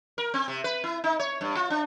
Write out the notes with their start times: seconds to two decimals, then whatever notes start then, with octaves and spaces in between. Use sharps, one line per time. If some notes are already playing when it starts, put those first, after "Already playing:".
0.18 A#4
0.34 C4
0.48 C3
0.64 B4
0.84 E4
1.04 D#4
1.19 C#5
1.41 G2
1.56 F4
1.70 D4